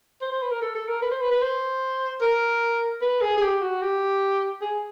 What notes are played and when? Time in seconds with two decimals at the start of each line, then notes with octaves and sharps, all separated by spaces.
0.22 C5
0.32 C5
0.42 B4
0.51 A#4
0.62 A4
0.75 A4
0.88 A#4
1.02 B4
1.11 C5
1.21 B4
1.31 B4
1.42 C5
2.21 A#4
3.01 B4
3.22 G#4
3.37 G#4
3.41 G4
3.62 F#4
3.82 G4
4.62 G#4